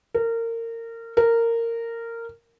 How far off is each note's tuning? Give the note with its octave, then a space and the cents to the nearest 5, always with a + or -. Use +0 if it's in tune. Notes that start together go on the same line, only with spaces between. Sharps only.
A#4 -25
A#4 -15